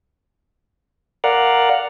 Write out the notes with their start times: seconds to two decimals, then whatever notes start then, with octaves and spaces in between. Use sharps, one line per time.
1.24 A#4 D5 F5 F#5